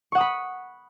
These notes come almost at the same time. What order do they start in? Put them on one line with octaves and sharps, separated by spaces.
C#6 F#5 D#6 B5